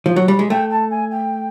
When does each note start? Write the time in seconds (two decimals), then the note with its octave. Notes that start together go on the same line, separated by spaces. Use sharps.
0.06 F3
0.16 F#3
0.28 G3
0.39 G#3
0.50 A3 G5
0.70 A5
0.90 G#5
1.11 G5